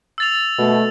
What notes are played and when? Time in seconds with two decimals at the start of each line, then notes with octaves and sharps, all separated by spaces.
0.18 E6 A6 F7
0.59 B2 A3